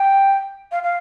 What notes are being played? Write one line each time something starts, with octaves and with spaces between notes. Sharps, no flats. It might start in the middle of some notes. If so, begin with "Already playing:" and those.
Already playing: G5
F5
F5